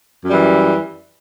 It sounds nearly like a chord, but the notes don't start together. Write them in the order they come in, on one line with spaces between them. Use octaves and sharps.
F#2 G3 E3